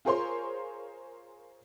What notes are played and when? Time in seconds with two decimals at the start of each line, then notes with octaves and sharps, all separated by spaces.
0.05 F4 G#4 A#4 C5 C#5 C6